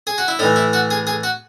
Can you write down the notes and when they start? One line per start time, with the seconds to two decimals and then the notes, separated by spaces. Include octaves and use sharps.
0.07 G#4
0.18 F#4
0.28 E4
0.39 A2 D#4
0.43 E3
0.56 E4
0.73 F#4
0.91 G#4
1.07 G#4
1.23 F#4